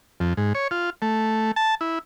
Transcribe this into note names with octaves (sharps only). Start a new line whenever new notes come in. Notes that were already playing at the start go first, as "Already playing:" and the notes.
F2
G#2
C#5
F4
A3
A5
E4